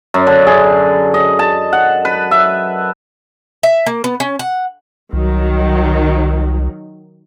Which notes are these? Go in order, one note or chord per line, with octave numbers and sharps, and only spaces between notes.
F#2
D3
G#4
D#5
A5
F#5
B4
E5
E5
A#3
B3
C#4
F#5
C2 D#3 F#3